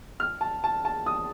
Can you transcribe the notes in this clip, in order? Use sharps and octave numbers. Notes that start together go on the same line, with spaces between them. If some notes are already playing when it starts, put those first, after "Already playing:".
F6
A5
A5
A5
D#6